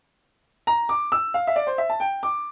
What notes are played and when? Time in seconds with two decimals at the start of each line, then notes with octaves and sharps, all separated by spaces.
0.67 A#5
0.89 D6
1.12 E6
1.34 F5
1.47 E5
1.56 D5
1.67 C5
1.78 E5
1.90 A5
2.00 G5
2.23 D6